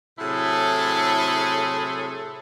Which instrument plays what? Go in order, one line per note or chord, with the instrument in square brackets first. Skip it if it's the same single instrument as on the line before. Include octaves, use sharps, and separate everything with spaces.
[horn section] A2 C3 F#3 E4 G#4 A4